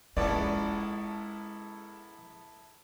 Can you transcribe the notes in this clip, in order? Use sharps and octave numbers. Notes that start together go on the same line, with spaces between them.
A#1 G#3 B3 C#4 E4 A4 D5 A5